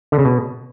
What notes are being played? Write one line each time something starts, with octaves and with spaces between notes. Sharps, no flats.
D3
C#3
B2